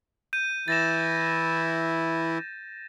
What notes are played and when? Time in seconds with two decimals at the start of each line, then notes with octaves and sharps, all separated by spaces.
0.33 G6 D#7
0.68 E3 E4 A6 A#6 E7